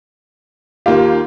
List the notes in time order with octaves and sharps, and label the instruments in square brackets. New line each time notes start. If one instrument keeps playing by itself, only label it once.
[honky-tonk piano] D#2 F5 [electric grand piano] A#3 F4 G4